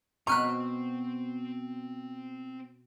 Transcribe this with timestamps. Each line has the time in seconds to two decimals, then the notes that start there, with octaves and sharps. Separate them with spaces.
0.27 B2 C4 C5 A#5 B5 C#6 F6 F#6